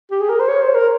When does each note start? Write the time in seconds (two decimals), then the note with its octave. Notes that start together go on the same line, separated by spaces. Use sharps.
0.11 G4
0.21 G#4
0.30 A#4
0.40 C5
0.49 C#5
0.62 C5
0.75 A#4